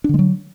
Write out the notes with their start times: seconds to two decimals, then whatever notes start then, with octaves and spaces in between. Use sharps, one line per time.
0.04 D4
0.09 D3
0.14 G#3
0.19 F#3